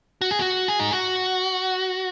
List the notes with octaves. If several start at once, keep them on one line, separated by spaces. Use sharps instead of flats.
F#4
G#4
F#4
G#4
D#4
F#4